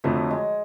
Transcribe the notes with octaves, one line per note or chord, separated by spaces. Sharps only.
F2 D3 F3 F#3 A3
G#3